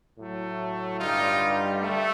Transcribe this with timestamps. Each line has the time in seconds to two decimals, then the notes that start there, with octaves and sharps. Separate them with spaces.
0.18 A2 F#3 A3
1.00 G2 D3 G3 D#4 F4
1.82 A3